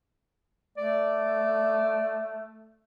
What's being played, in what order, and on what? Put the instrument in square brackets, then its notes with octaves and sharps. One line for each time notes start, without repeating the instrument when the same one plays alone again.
[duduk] A3 [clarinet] D5